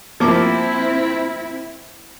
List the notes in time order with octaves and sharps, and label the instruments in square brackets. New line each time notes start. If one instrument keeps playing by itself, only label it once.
[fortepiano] F3 A#3 D6 [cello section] C4 E4